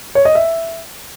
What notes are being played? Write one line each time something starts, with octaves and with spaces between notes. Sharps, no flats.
C#5
D#5
E5